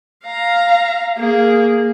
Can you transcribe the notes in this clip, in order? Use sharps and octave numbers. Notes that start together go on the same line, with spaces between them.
F5 A#5
A#3 G#4